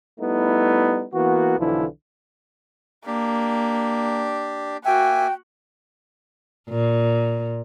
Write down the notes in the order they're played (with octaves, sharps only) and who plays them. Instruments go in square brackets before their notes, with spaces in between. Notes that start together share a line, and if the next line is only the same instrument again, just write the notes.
[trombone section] G3 A3 B3 D#4 E4
E3 A#3 B3 F#4
B1 D3 E3 F3 E4
[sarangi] A#3 [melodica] D4 G4
[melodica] A#3 E5 G#5 [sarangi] F#4 [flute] G5
[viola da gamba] A#2